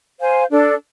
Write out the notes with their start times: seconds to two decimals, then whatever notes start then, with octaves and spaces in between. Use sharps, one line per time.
0.20 C5 F5 G#5
0.50 D4 A4 D5